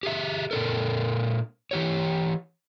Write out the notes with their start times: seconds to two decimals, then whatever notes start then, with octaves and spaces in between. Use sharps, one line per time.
0.03 G4 G#4 E5
0.51 A#2 D4 A4 A#4
1.71 E3 G4 C#5